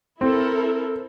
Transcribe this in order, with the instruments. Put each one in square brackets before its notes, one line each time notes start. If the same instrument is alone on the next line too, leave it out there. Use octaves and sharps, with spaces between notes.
[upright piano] C4 [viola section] E4 A4 A#4